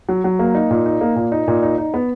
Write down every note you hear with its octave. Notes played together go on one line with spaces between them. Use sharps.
F#3
F#3
A#3
D#4
A#2
D#4
A#3
A#2
D#4
A#2
D#4
D#4
B3